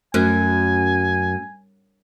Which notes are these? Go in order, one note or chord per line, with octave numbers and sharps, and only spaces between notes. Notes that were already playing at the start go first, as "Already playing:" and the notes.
F#2 A3 C#4 G#5